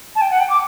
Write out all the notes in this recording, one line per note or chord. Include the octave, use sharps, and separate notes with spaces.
A5
G5
F#5
G5
D6